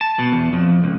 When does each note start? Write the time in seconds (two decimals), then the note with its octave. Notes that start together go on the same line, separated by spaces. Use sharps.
0.01 A5
0.19 B2
0.32 E2
0.53 F2
0.84 C#2